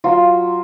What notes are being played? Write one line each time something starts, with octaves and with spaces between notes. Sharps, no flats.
F#3 F4